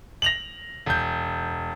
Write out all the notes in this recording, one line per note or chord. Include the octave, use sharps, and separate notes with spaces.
A#6 F7 F#7
E1 G6